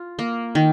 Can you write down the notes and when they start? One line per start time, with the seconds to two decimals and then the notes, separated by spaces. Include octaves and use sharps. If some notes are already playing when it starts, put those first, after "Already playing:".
Already playing: F4
0.19 A#3
0.55 D#3